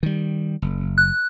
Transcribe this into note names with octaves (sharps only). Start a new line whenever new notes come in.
D#3 G3
F#1
F#6